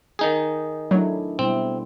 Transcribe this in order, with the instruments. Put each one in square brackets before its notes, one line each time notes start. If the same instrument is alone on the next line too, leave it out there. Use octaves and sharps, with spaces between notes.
[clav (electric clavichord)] D#3 D#4 G#4
[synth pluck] F#3 [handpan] A3 D4 E4
[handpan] B2 G3 E4 [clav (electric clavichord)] C4